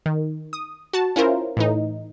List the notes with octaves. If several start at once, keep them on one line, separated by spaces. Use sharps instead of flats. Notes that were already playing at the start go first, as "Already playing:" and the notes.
D#3
D#6
F#4 F#5 A5
C#4 E4 F4 A#4 C5
A2 E3 D#4